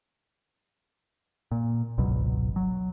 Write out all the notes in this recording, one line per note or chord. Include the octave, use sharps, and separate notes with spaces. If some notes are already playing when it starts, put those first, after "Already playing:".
A#2
G#1 C#2 B2 F#3
F#3